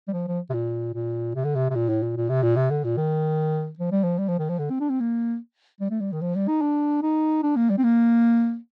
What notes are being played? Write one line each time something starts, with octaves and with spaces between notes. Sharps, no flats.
G3
F3
F3
C3
A#2
A#2
C3
D3
C3
C3
A#2
A2
A#2
A#2
C3
A#2
C3
D3
A#2
D#3
F3
G3
F3
G3
F3
D#3
F3
D3
C4
D4
C4
A#3
G3
A3
G3
D#3
F3
G3
D#4
D4
D#4
D4
A#3
G3
C4
A#3